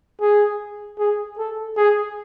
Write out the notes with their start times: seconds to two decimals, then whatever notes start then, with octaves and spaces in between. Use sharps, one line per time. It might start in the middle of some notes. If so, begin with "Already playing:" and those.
0.21 G#4
0.99 G#4
1.38 A4
1.77 G#4